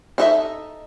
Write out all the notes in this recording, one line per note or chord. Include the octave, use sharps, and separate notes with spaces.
D4 D#4 A4 D#5 E5